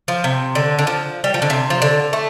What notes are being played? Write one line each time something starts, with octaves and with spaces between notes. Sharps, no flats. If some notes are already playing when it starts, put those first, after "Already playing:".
F3
C3
D3
D3
F3
G3
F3
D3
C3
F3
D3
A3